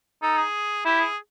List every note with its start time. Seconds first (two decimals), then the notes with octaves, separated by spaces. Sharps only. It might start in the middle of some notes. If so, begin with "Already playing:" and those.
0.23 D#4 A4
0.38 G#4
0.85 E4 G4
1.00 G#4